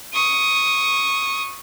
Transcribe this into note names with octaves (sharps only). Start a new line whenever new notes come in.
C#6 D#6